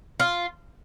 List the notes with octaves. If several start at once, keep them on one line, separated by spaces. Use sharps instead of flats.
F4